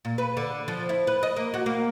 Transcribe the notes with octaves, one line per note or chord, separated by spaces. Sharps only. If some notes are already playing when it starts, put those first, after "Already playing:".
A#2
B4
D3
F3
E4
B4
D#5
A#3
F#4
A#3